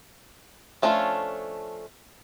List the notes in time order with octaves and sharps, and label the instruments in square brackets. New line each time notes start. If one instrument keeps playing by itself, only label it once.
[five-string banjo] F3 A3 C#4 D4 F4